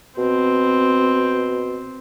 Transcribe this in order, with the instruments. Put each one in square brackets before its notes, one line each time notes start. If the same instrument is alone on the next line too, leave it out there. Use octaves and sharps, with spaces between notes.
[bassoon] B2 [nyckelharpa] C4